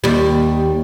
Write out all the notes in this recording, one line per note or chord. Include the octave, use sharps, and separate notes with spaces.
D#2 G3